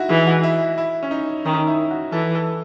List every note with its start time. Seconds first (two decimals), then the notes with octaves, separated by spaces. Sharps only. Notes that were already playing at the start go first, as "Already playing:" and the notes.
Already playing: D#4 E4 F#4
0.09 E3 G#4
0.27 F#4
0.43 E4
0.78 E4
1.03 C#4
1.11 D#4
1.45 D#3 C#4
1.67 E4
1.91 F#4
2.12 E3 A4
2.35 A4